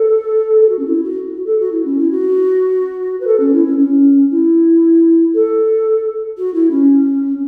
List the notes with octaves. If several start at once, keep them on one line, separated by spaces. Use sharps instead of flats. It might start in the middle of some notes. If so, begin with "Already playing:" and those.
Already playing: A4
A4
F#4
C#4
E4
F#4
F#4
A4
F#4
E4
C#4
E4
F#4
B4
A4
C#4
E4
C#4
C#4
E4
A4
F#4
E4
C#4